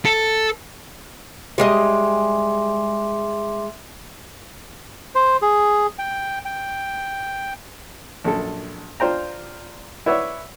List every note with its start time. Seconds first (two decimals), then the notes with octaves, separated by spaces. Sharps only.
0.05 A4
1.58 G3 G#3 D#5 E5 C6 D6
5.15 C5
5.42 G#4
5.99 G5
6.45 G5
8.24 A#1 F#2 A4
9.00 D4 F4 C5 G5 A#5
10.06 E4 B4 C#5 D5 E5 F#5